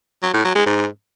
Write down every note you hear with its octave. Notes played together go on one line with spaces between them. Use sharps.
F#3
A2
F#3
G#3
G#2